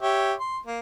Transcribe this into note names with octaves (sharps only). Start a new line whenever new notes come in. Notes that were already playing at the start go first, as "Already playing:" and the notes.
G4 C#5 E5
C6
A#3